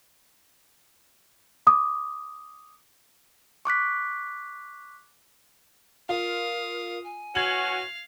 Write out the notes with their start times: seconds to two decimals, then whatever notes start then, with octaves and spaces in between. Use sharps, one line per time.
1.67 D6 D#6
3.65 C#6 D6 F#6 B6
6.09 F4 A#4 F5 D#6
7.03 G#5
7.35 E3 C#4 F#4 F5 G#6 F#7